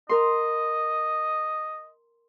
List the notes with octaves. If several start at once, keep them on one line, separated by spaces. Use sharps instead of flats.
A#4 D#5 C6